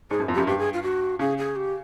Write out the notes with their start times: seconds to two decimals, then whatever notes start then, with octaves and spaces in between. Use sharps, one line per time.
0.10 G#2 G#4
0.20 F#2
0.28 F2
0.34 F#2 G4
0.47 G2 G4
0.58 G#4
0.73 F4
0.83 F#4
1.19 C#3 G#4
1.38 G#4
1.56 G4